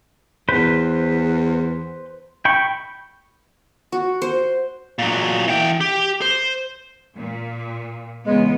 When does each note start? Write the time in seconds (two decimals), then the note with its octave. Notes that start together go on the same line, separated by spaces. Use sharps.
0.49 E2 B4 C5 B5
2.45 G5 B5 C#6
3.92 F#4
4.22 C5
4.99 A#2 F#3
5.48 E3 G5
5.81 G4
6.22 C5
7.15 A#2
8.26 E2 C#3 G#3 B3